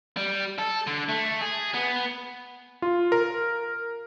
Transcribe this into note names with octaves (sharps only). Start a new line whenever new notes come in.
G3
A4
D3
A3
G#4
B3
F4
A#4